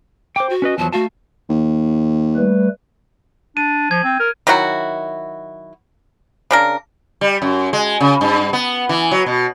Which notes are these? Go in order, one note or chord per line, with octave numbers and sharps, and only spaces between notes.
C5 G5 D6
F#4
C#4 B4 D#5
E2 F3 F#3 A5
A3 F#4 F5 A5
D#2
G3 A3 B4
D4 D#7
F3 G#6
C4
A#4
D#3 F#3 E4 F#4
C#3 D4 A#4
G3
F#2
G#3
C#3
G2
B3
E3
F#3
B2